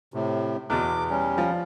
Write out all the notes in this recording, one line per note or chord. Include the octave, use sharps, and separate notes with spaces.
A2 C3
E2 B2 D6
G3 C#4
F3